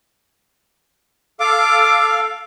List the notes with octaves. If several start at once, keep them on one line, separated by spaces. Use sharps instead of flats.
A4 F5 D6